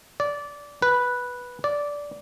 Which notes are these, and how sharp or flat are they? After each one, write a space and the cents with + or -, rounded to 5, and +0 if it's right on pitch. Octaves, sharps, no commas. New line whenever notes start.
D5 -20
B4 -5
D5 -15